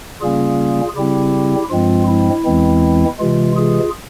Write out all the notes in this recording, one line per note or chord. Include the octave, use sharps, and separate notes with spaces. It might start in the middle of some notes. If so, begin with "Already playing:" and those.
C#3 G3 A#3 C#4 F4 G#4
C#3 G3 C4 E4 G4
G2 F3 G#3 C4 F4
E4
E2 E3 G#3 C4
C3 E3 G#3 F4
F4 G#4